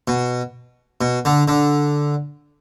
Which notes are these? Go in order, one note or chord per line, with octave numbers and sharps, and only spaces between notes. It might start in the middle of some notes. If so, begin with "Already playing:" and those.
B2
B2
D3
D3